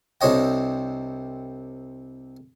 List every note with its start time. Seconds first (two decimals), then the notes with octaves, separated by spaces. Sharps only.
0.21 C2 C3 D4 C#5 D#5 G5